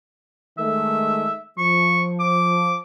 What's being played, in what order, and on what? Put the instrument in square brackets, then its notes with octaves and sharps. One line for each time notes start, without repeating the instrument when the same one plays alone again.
[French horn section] D#3 G#3 A3 [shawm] E5
[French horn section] F3 [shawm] C#6
[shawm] D6